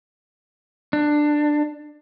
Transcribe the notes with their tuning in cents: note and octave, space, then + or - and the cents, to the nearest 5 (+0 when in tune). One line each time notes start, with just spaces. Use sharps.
D4 +15